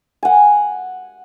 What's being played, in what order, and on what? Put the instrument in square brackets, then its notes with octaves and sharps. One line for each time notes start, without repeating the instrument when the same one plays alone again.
[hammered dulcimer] F#5 G#5